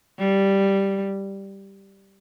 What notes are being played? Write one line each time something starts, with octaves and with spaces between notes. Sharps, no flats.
G3